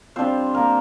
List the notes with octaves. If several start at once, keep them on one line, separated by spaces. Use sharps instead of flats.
G3 C4 D4 F4 C5
A#3 A#4